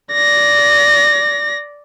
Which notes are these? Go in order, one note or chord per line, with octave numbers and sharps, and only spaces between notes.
D5 A#6